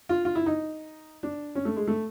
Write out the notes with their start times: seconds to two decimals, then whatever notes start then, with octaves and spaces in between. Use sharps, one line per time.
0.09 F4
0.25 F4
0.35 E4
0.46 D#4
1.23 D4
1.55 C#4
1.65 A3
1.77 G#3
1.87 A3